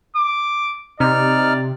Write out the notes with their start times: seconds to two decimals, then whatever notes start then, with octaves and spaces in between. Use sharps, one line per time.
0.16 D6
1.00 C3 D#4 D5 F6